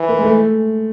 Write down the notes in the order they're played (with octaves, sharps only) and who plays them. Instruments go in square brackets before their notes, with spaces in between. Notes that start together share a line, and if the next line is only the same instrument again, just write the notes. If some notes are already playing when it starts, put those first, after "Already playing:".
Already playing: [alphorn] E3
[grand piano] A#3
G#3
A3